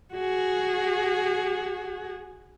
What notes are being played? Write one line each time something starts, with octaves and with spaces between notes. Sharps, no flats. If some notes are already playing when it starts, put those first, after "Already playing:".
F#4 G#4